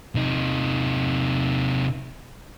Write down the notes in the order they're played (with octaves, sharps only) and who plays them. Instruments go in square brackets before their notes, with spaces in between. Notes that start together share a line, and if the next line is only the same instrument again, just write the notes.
[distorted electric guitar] C3 D#4